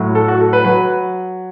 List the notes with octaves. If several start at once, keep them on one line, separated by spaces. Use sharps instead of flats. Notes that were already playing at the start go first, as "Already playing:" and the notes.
Already playing: A2 F#3
A4
F#4
A4
B4
F#3 B4